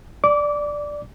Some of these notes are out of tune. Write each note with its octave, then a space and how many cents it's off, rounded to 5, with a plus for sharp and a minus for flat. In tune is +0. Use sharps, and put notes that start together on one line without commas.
D5 +0 D6 -25